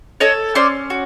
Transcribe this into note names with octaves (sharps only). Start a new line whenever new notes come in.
A4 C#5 D#5
C#4 C5 D5
F#4